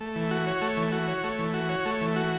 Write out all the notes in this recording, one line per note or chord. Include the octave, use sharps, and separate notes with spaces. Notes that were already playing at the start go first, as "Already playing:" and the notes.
A3
E3
F#4
C#5
A3
E3
F#4
C#5
A3
E3
F#4
C#5
A3
E3
F#4